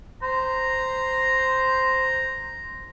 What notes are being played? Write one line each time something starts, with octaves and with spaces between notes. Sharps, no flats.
C5 A#5